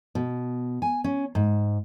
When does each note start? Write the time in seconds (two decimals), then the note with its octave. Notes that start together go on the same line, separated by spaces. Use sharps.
0.15 B2
0.82 G#5
1.04 C#4
1.35 G#2